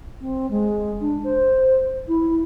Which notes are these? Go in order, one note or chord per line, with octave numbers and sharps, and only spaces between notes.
C4
G#3
D4
C5
E4